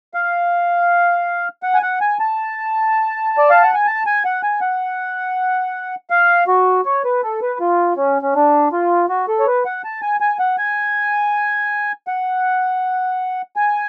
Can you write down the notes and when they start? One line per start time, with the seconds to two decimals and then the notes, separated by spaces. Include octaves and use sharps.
0.14 F5
1.63 F#5
1.74 G#5
1.82 F#5
2.01 G#5
2.20 A5
3.38 D5
3.50 F5
3.63 F#5
3.74 G#5
3.87 A5
4.06 G#5
4.25 F#5
4.43 G#5
4.61 F#5
6.10 F5
6.47 F#4
6.86 C#5
7.04 B4
7.23 A4
7.42 B4
7.60 F4
7.97 C#4
8.22 C#4
8.35 D4
8.72 F4
9.09 F#4
9.28 A4
9.40 C#5
9.47 B4
9.65 F#5
9.84 A5
10.02 G#5
10.20 G#5
10.39 F#5
10.58 G#5
12.07 F#5
13.56 G#5